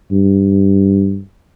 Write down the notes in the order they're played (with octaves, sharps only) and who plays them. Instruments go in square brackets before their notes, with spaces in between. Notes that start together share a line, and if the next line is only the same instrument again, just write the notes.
[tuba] G2